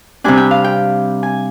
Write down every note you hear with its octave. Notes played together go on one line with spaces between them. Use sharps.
C3 G3 D4 G#5
G5
F5
G5
G#5